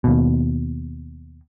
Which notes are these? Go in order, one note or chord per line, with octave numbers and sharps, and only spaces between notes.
D#2 B2